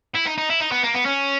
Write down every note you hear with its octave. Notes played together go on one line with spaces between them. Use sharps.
E4
D#4
D#4
E4
D#4
B3
A#3
B3
C#4